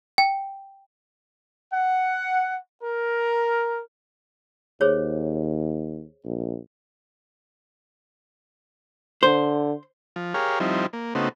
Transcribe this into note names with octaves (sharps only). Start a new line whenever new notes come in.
G5
F#5
A#4
D#2 G#4 C5 C#5
A#1
D3 C5
F3
G4 G#4 A#4 C#5 F5
F3 G3 C4 D#4 E4
A#3
C#3 A3 B3 C4 D#4 F#4